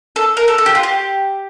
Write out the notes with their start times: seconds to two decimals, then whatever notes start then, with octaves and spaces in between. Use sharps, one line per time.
0.16 A4
0.37 A#4
0.48 A4
0.58 A4
0.66 G4
0.75 F4
0.83 G4